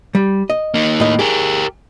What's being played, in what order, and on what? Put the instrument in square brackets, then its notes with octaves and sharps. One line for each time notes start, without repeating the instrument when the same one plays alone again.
[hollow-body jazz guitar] G3
D#5
[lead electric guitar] A#3 D#4
[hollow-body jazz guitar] A2 D#5
[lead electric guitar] G4 A#4 [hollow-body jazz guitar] G#4